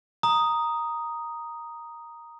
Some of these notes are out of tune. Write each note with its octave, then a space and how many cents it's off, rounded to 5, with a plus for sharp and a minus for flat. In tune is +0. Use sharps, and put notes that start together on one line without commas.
A#5 +0 D#6 +0